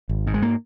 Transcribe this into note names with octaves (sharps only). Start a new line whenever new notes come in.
G#1
G#2
G#3
A#3